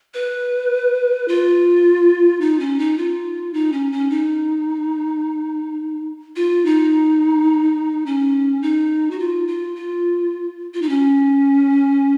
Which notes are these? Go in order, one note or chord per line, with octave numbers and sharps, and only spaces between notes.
B4
F4
D#4
C#4
D#4
F4
D#4
C#4
C#4
D#4
F4
D#4
C#4
D#4
F#4
F4
F4
F4
F4
D#4
C#4